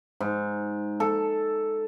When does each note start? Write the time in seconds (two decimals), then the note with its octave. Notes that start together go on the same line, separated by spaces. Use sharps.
0.21 G#2
1.00 A4